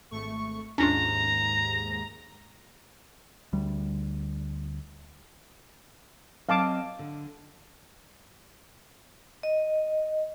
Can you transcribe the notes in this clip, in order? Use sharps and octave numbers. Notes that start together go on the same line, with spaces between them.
G#1 A3 C#6
D#2 G#2 C#4 D4 F4 A#5
D2 G3
F#3 C4 D#5 F5 A5 D6
D3
D#5